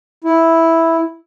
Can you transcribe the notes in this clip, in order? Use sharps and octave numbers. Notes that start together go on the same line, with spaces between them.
E4